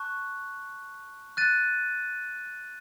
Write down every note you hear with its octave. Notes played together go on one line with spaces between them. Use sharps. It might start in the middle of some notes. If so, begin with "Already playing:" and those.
Already playing: A5 C#6 F#6
F#6 A6 D#7